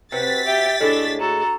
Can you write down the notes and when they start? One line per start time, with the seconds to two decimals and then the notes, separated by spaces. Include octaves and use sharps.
0.12 C3 F#3 C4 B4 A6 B6
0.46 G4 E5 G5
0.81 A2 G#3 D4 A4
1.20 F#4 A4 A#5